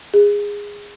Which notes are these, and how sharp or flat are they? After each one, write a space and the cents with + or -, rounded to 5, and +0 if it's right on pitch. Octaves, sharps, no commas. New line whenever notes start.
G#4 -20